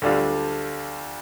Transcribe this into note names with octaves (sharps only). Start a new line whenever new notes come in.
D2 D3 G3 D4 F4